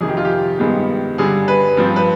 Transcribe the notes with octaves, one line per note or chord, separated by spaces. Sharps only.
F2 C3 D#3 G#4
G4
F4
G4
G2 D#3 G#3 B3
G2 D3 G3 G#4
B4
G2 F3 C4
B4